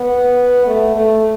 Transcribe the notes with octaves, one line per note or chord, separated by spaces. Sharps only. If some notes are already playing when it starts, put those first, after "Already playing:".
Already playing: B3
A3
A3